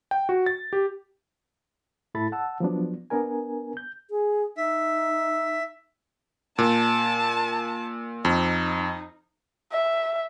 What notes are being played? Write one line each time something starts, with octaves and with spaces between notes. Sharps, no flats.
G5
F#4
A6
G4
A2 E4 A4 B5 A6
F#5 A5 E6
F3 F#3 B3 D4
B3 D4 A#4 G#5
G6
G#4
D#4 E5
A#2 A5
F2 D#4
E5